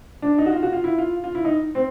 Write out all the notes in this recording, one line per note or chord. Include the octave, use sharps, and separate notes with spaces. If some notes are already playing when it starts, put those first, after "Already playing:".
D4
D#4
F#4
F4
F#4
F4
E4
F4
F4
E4
D#4
C4